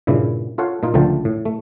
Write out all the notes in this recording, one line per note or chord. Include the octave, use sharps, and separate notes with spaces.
G2 A#2 C#3 E4
F4 A4 C#5 F5 F#5
A#2 D#4 F4
C#2 D3 F3 A3 G5 A5
A2
A3